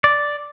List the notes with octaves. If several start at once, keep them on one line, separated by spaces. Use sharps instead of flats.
D5